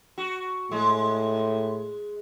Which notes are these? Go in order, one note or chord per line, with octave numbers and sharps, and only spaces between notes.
F#4
A2 G#3